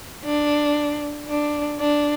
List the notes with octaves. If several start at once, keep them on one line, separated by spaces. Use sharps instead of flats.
D4
D4
D4